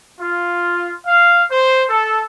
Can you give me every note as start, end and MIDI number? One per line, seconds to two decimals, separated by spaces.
0.21 0.94 65
1.07 1.43 77
1.52 1.84 72
1.90 2.24 69